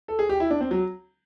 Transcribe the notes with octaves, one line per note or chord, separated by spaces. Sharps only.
A4
G#4
G4
E4
D4
C4
F#3